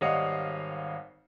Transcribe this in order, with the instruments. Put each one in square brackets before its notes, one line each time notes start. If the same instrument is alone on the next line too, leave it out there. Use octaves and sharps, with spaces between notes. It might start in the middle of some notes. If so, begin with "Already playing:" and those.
[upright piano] G#1 G3 C#5 D#5 F5 F#5